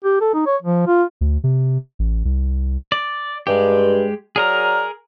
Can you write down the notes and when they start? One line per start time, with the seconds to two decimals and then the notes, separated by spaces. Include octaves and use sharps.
0.04 G4
0.21 A4
0.34 D#4
0.46 C#5
0.62 F3
0.87 F4
1.21 D2
1.44 C3
1.99 A1
2.25 C2
2.92 D5
3.47 G2 G#3 G4
4.36 F#3 G#4 A#4 D5 A#5 F6